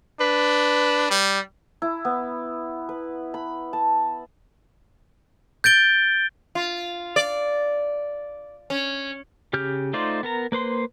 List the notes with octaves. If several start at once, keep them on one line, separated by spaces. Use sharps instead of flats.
D4 B4
G3
E4
B3
B4
B5
A5
G6 A6 D7 G7
F4
D5
C#4
C#3 G4 F6 G6
A3 D#4 F4 C5 D5
B3 A#4 A#5
A#3 B4 C5 C6